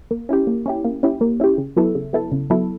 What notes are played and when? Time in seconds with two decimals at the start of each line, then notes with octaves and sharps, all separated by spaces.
0.11 A#3
0.29 C#4 E4 G4
0.47 A#3
0.66 C#4 E4 G4
0.85 A#3
1.03 C#4 E4 G4
1.21 A#3
1.40 C#4 E4 G4
1.58 C#3
1.76 F#3 B3 E4 A4
1.95 C#3
2.13 F#3 B3 E4 A4
2.32 C#3
2.50 F#3 B3 E4 A4